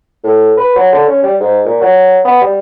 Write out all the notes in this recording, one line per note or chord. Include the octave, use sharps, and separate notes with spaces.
A2
B4
F#3
D3
C#4
G3
G#2
A#2
F#3
B3
G3